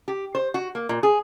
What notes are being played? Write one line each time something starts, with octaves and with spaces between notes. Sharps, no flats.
G4
C5
F#4
A#3
A#2
G#4